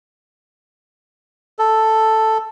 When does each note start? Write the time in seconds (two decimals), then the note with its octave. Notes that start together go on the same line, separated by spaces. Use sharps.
1.59 A4